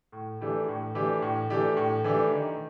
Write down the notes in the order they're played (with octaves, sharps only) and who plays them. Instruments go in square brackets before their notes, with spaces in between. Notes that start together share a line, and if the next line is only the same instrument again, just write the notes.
[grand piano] A2
E3 A3 D4 G4
A2
E3 A3 D4 G4
A2
E3 A3 D4 G4
A2
E3 A3 D4 G4
D#3